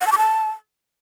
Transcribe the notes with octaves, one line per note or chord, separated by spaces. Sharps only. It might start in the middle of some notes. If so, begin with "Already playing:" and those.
F#5
A5
D6
A5